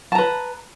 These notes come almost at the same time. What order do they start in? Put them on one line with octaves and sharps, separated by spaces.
A5 A#5 B4